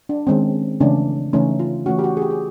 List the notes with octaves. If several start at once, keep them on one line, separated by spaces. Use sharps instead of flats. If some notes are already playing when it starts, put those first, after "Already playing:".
D4
D#3 G#3 C4 C#4
C#3 E3 A3 C#4 D4
C#3 E3 A3 C#4 D#4
F4
E3 A3 C#4 F#4
G4
F#4
G#4
G4
G#4